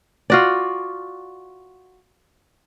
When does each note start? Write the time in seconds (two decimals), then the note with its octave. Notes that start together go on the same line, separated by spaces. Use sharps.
0.30 F4 F#4 D5